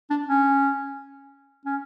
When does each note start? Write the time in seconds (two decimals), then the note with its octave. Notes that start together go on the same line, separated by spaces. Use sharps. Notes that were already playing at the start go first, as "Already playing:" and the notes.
0.10 D4
0.28 C#4
1.65 C#4